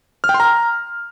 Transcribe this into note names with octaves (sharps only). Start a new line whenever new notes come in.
F6
G5
C6
A#5